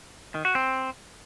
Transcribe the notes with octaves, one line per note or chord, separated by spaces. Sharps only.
D#3
F#4
C4